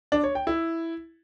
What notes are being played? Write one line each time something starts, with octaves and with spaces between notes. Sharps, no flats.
D4
C#5
G5
E4